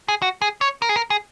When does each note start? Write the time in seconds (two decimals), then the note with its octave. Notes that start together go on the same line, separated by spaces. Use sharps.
0.08 G#4
0.22 F#4
0.42 G#4
0.61 C#5
0.82 A#4
0.89 G#4
0.96 A#4
1.10 G#4